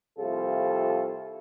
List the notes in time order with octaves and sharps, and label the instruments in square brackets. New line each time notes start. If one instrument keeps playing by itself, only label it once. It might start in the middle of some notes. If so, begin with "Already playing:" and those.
[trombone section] C2 C3 F3 A3 F4 A4